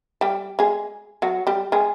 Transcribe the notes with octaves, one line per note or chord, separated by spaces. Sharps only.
G3 G4
G#3 G#4
F#3 F#4
G3 G4
G#3 G#4